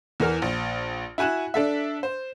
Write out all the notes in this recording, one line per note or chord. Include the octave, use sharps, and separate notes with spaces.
E2 E3 A#4 F6
A#1
E4 F#4 G#5 F#6 E7
D4 A4 E5
C5